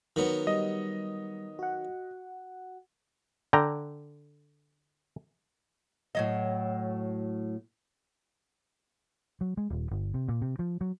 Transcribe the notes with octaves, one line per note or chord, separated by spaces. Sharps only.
D#3 F#3 B3
G3 D#5
F#4 F#5
D3 G5 A#5
A2 F#3 D#5
F#3
G#3
D#1
G1
C3
A#2
C3
F3
F#3